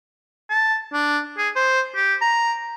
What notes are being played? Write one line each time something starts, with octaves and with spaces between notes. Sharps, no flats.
A5
D4
G#4
C5
G4
A#5